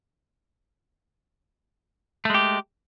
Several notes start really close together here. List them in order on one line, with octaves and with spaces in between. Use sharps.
A3 G#3 G4